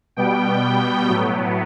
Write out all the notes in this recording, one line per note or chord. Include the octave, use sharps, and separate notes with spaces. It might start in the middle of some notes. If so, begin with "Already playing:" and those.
B2 G3 B3 G5
A2 F#3 B3